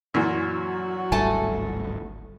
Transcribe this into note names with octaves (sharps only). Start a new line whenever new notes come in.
F#2 A#2 E3 F#3 F#4
D1 G#1 G3 A3 G#5 A5